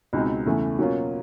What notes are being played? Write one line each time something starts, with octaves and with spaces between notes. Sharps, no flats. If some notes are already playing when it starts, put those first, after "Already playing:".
C#2 B2 G#3 C4 D#4
E2 C#3 E3 A3
B2 F#3 A#3 C#4 F4